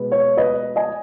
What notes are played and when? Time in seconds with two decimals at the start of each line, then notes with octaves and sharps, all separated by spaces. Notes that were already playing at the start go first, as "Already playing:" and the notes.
Already playing: B2 G#3 B3
0.12 C#5
0.37 B4 D#5
0.76 D#5 G#5